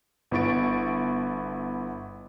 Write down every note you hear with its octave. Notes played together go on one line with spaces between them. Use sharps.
G1 B3 E4 C#6 A6 D7